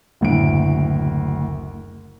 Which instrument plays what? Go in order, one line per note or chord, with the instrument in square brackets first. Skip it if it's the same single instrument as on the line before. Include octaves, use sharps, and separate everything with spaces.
[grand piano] F#1 D2 A2 D7